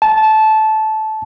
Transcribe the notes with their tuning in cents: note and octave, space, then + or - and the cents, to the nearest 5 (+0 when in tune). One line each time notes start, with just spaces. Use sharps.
A5 -15